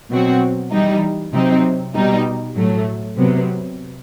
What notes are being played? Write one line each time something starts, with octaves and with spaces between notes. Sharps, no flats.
B2 F#3 C4 F#4
E3 G3 D#4
C3 F#3 C4 D#4
B2 G3 D#4
A2 F#3 A3
C3 F#3 B3